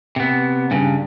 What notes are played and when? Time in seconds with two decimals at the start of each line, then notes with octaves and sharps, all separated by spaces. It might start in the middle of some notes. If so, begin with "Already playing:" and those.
0.16 C3 B3
0.71 G2 C#3